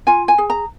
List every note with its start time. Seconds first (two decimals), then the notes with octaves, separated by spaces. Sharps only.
0.07 F4 G#5
0.28 G#5
0.38 G#4
0.50 A#5